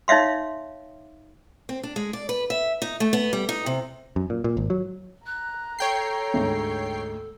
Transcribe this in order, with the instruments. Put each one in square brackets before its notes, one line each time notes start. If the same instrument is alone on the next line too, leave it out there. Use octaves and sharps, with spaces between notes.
[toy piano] D#4 C#5 E5 F5 C6
[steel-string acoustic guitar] C4
D4
G#3
D5
B4
E5
D#4
A3
B3
G3
D#4
C3
[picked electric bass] F#2
A#2
A#2
G#1
F#3
[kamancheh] A#5 [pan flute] F#6
[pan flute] A4 [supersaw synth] C#5 G5 C7
[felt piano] D2 G#2